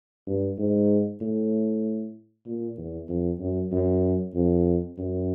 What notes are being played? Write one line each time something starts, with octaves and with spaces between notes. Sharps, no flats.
G2
G#2
A2
A#2
E2
F2
F#2
F#2
F2
F#2